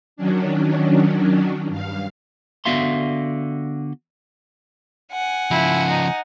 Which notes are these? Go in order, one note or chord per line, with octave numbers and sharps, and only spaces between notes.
D#3 F#3 C#4 D4
G2 F5
D3 B3 F#4 E5 F5 C6
F#5 G#5
C#3 F3 E4
D#4